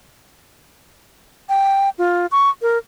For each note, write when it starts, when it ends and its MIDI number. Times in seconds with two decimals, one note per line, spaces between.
1.49 1.90 79
1.98 2.26 65
2.32 2.50 85
2.62 2.78 70